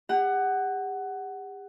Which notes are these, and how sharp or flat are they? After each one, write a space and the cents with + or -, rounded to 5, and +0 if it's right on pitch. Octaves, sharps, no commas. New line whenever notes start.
G4 +45 F#5 +15